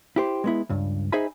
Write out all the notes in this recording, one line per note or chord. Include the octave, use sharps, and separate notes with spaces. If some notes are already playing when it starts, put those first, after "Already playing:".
E4 G4 C5
G#3 B3 E4
C#2 G2
D#4 G#4 C5 E5 G#5 B5